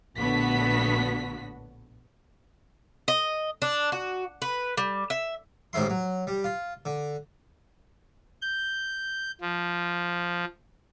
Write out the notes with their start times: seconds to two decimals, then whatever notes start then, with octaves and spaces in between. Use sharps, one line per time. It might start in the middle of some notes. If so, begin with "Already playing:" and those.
0.18 A#1 A2 D3 B3 F#4 B6
3.08 D#5
3.62 D4
3.92 F#4
4.42 B4
4.77 G3
5.10 E5
5.73 A1 G#2 D#3 E4 C6
5.90 F#3
6.27 G3
6.44 F4
6.85 D3
8.42 G6
9.41 F3